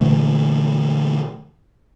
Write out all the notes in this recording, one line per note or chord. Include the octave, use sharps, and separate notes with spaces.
A#2 D3 E3 A3